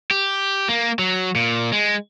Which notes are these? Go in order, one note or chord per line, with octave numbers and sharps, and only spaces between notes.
G4
A#3
F#3
A#2
G#3